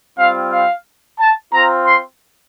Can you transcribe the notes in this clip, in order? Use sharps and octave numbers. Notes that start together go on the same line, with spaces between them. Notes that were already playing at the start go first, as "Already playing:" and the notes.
G3 C4 F4 F5
F5
A5
C4 F4 A#5
C6